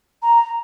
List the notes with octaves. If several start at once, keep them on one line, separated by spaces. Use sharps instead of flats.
A#5